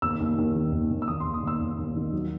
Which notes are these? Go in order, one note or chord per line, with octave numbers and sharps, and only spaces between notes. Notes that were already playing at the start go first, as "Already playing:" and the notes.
D#2 E6
D#2
D#2
D#3
D#2
D#2
E6
D#2 D#6
D#2 C6
D#6
D#2 E6
D#2
D#2
D#3
F#3